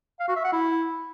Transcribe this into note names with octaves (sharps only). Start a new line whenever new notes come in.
F5
F#4
E5
F#5
E4